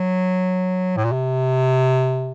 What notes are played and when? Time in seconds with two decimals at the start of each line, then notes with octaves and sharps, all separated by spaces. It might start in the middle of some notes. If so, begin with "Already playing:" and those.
Already playing: F#3
0.97 A2
1.05 A#2
1.12 C3